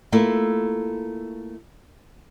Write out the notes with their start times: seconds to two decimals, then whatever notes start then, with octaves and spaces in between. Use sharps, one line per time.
0.12 A3 A#3 E4 F4